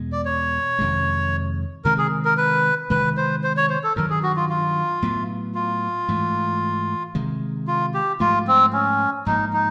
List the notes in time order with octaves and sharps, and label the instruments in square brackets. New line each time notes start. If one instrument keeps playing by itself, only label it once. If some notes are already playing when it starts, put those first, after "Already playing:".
Already playing: [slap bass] E2 B2 G#3
[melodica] D5
C#5
[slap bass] F2 C3 D#3 G#3
[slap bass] C3 D#3 G#3 C4 [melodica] A#4
[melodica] G#4
A#4
B4
[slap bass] C3 D#3 G#3 [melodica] B4
[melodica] C5
C5
C#5
C5
A4
[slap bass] G2 D#3 F#3 [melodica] A#4
[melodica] G#4
F#4
F4
F4
[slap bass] A2 F#3 B3
[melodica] F4
[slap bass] G#2 E3 A3
C3 D#3 G#3
[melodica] F4
G4
[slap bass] G#2 F3 A3 [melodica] F4
[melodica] C4
C#4
[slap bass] G#2 F3 A#3 [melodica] D#4
[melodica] D#4